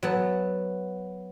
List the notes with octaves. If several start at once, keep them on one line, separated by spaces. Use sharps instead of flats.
F#3 B3 A5